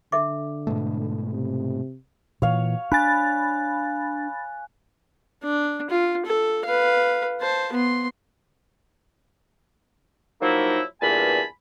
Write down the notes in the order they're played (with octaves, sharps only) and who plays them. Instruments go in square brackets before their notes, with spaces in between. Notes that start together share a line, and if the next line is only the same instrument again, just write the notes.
[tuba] D3 [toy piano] A4 E5 D6
[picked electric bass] G#2 B2 A3
[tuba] C3
[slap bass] A#2 E3 [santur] C#5 F5
[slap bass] D4 [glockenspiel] G#5 F#6 [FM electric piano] B5 A6
[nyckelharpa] D4
F4
A4
B4 F5
C5 A5
B3 C6
[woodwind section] F3 F#3 A#3 D#4 E4
E2 G2 A#2 G#5 A5 B5